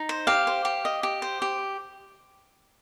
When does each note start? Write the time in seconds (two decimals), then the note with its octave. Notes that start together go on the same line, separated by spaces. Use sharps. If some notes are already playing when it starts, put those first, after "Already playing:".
Already playing: D#4
0.09 C5
0.27 G4 F5
0.47 C5
0.65 G4
0.85 D#5
1.03 G4
1.22 C5
1.42 G4